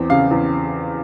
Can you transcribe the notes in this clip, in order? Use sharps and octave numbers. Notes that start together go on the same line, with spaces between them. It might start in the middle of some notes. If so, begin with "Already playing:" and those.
Already playing: E2 C4
C#3 F5
E2